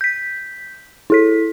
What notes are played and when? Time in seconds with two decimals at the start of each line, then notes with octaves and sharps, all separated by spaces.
0.01 G6 B6
1.10 E4 A4 B6